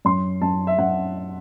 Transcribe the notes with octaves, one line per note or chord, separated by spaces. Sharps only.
F#2 C6
F#2 A5
E5
F#2 F#5